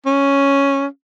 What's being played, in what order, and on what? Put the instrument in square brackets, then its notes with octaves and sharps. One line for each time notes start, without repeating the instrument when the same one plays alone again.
[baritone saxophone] C#4